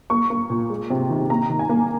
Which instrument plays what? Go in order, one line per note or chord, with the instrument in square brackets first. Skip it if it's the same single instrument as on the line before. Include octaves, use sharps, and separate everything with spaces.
[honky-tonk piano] A#3 C#6
A#3
A#2
G#3
C3
D#3
A#3 A#5
D#3
G#5
A#3